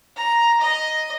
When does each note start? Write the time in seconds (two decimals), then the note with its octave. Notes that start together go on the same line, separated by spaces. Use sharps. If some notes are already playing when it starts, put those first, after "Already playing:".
0.16 A#5
0.61 D#5